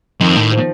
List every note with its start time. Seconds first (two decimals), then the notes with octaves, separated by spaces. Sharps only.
0.20 F2 D#3
0.36 A2
0.52 F3